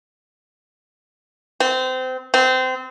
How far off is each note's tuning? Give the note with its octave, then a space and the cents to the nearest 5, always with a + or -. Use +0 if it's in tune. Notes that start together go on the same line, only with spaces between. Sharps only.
C4 -25
C4 -25